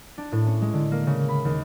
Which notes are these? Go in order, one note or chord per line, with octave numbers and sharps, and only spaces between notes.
D4
A2
C#4
G#3
D3
A#3
C#3
B5
D#2